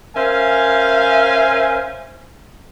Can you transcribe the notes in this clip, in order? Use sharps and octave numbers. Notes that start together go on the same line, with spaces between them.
C#4 A#4 C5 E5 F5 G#5